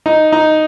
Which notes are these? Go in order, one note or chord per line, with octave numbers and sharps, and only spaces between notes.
D#4
D#4